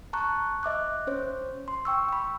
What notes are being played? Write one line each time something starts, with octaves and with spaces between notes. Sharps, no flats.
A5 A#5 C#6 F#6
D#5 E5 D6 F#6
C#4 C5 C#5
C6
G5 C#6 E6
G5 B5